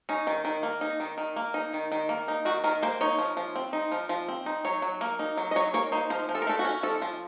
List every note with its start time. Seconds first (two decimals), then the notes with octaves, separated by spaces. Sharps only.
0.09 C#4 D#4
0.27 D#3
0.45 D#3
0.63 A#3
0.81 D#4
1.00 D#3
1.18 D#3
1.36 A#3
1.54 D#4
1.74 D#3
1.92 D#3
2.09 A#3
2.28 D#4
2.45 D#3 F#4
2.64 D#3 A#4
2.83 A#3 C5
3.01 D#4 C#5
3.18 F3
3.37 F3
3.56 C4
3.73 D#4
3.92 F3
4.09 F3
4.28 C4
4.46 D#4
4.65 F#3 C#5
4.82 F#3
5.01 A#3
5.19 D#4
5.37 F#3
5.51 D#5
5.56 F#3 C#5
5.74 A#3 C#5
5.92 D#4 C5
6.10 F3 C5
6.29 F3
6.35 A4
6.42 A#4
6.47 A3 A4
6.59 F#4
6.65 C#4
6.83 F3 A4
7.02 F3